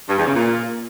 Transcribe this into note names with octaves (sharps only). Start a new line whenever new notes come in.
G2
E2
C#3
A#2